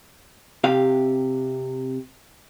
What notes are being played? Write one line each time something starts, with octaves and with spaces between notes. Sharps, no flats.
C3 G4 F5